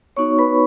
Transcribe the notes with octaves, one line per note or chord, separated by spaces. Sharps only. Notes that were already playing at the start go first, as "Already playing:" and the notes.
B3 D#4 F#4 C#5 C#6
B4 B5